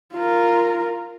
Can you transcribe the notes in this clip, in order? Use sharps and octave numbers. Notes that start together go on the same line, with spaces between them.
F4 A#4